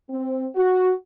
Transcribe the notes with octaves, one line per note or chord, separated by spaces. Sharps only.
C4
F#4